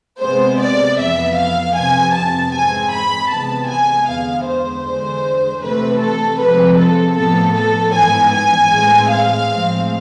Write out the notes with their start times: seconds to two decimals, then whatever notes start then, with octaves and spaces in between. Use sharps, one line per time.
0.21 C3 G#3 B3 C5
0.60 D5
0.98 F2 E3 B3 E5
1.37 F5
1.75 F2 C3 F3 B3 G#5
2.14 A5
2.53 G#2 E3 G#3 C4 G#5
2.92 B5
3.29 C3 E3 G#3 B3 A5
3.68 G#5
4.07 E2 D3 G#3 B3 F5
4.45 C5
4.84 E2 D3 G#3
5.62 C3 E3 A3 C4 B4
6.00 A4
6.39 C3 F3 G#3 C4 B4
6.77 A4
7.16 A2 F3 B3 A4
7.54 A4
7.93 G#2 E3 B3 G#5
8.31 G#5
8.71 A2 E3 G#3 C4
9.09 F5
9.48 A2 F3 G#3 C4